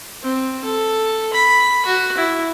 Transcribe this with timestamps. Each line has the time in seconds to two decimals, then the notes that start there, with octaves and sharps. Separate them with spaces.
0.23 C4
0.65 A4
1.33 B5
1.85 F#4
2.17 E4